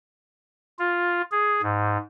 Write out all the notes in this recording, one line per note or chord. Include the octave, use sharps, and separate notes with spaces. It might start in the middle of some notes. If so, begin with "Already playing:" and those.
F4
G#4
G#2